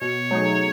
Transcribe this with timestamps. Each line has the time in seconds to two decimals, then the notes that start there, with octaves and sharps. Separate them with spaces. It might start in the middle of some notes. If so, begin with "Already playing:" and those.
0.01 B2 C#5
0.31 F#3 A3 D#4 G#4